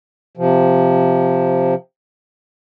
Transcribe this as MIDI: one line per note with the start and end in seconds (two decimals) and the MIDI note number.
0.37 1.75 48
0.37 1.75 53